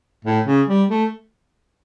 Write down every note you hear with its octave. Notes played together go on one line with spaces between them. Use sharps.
A2
C#3
G3
A3